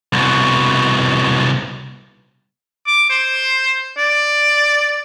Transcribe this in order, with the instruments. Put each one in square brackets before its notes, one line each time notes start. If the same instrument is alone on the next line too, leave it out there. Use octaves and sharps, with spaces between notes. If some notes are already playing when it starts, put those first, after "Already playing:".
[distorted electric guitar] C2 B2
[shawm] D6
C5
D5